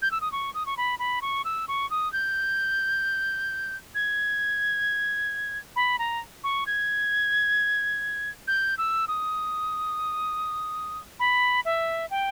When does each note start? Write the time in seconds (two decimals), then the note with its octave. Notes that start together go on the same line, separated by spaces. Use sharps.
0.02 G6
0.11 E6
0.21 D#6
0.32 C#6
0.54 D#6
0.66 C#6
0.77 B5
0.99 B5
1.22 C#6
1.45 E6
1.68 C#6
1.90 D#6
2.13 G6
3.95 G#6
5.76 B5
5.99 A#5
6.44 C#6
6.67 G#6
8.48 G6
8.78 E6
9.08 D#6
11.19 B5
11.65 E5
12.11 G5